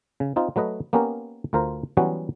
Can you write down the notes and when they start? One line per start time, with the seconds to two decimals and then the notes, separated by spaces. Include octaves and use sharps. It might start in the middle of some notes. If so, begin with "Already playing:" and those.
0.20 C#3
0.36 C4 D#4 F4
0.56 F#3 A3 B4 D#5
0.93 A#3 B3 C#4 G4 A#4
1.53 D2 F4 A#4 C5 A#5
1.97 E3 F#3 G3 B3 C#4 F#4